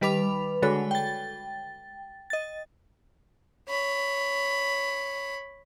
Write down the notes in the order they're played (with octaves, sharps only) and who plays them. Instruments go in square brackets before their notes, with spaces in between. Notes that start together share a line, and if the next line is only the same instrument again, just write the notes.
[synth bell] D#3 G3 B4 B5 D6 F7
D3 G#3 F#4 A4 C#5 B5
G5 A6
D#5 A6
[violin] C#5 B5